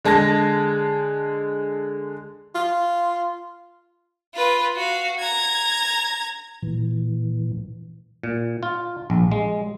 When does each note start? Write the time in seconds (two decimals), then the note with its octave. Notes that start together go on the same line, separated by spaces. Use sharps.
0.05 D3 G#3 A5 G#6 A#6
2.55 F4
4.34 F4 B4
4.77 F#4 F5
5.19 A#5 G#6
6.62 A#2 E3
8.23 A#2
8.63 F4
9.10 A#1
9.32 G#3